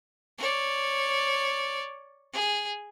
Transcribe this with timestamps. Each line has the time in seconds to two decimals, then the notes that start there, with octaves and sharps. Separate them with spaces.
0.38 C#5 D5
2.33 G#4